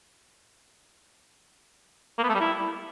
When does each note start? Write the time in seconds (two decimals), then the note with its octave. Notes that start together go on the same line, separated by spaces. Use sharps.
2.18 A#3
2.24 B3
2.29 A3
2.35 G3
2.40 E4